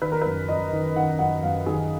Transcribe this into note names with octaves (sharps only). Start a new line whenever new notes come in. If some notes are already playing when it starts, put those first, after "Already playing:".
D#3 B4
A#4
F#2 B4
F#2 D#5
D#3
D#3 F#5
F#2 F#5
F#2 F5
D#3 G#4